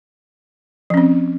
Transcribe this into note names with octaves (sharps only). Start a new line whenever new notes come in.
F3 C4 C#4